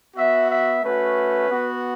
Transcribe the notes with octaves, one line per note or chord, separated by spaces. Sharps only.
B3 F#4 E5
E5
A3 C#4 F#4 B4
B3 F#4